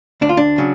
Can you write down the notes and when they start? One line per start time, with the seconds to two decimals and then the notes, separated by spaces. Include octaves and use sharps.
0.21 D2 D4
0.29 F4
0.37 D4
0.58 C#3 F#3